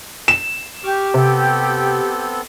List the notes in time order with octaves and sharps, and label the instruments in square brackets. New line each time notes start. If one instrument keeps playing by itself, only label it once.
[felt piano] E7
[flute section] G4 [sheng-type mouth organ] C#6 D6 F6
[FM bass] C3 [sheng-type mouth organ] B3 C4 A4